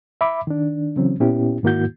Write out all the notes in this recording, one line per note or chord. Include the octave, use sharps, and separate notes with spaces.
E5 B5 D6
D#3 D4
C#3 E3 F#3 C4 C#4
A#2 B3 C#4 E4 G4
G#2 D#3 A#3 E4 F#4 G6